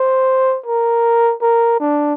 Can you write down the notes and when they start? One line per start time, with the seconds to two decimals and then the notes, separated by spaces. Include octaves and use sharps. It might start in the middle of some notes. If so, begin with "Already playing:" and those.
Already playing: C5
0.66 A#4
1.42 A#4
1.80 D4